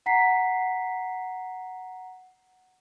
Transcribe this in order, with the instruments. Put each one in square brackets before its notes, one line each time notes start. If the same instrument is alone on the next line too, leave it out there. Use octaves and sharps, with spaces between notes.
[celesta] F#5 A#5 B6 C7